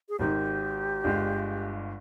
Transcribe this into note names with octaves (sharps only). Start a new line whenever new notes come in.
G#4
G#1 G#2 D#3 G4
G1 G2 D3 G#3